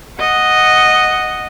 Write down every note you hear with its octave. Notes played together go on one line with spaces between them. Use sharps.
D#5 F#5